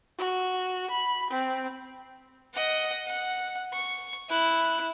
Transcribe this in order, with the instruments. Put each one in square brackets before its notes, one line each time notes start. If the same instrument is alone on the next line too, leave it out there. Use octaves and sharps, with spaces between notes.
[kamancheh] F#4
B5
C4
[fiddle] D#5 F#5
F#5
C#6
E4 F#6